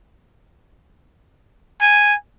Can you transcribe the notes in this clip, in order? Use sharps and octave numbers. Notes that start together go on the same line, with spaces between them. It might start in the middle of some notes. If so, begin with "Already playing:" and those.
G#5